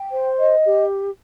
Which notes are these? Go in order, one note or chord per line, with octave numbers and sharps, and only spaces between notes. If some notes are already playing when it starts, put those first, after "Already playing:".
Already playing: G5
C5
D#5
G4